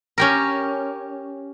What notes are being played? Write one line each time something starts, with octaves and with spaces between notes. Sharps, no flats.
C#4 G4 A#4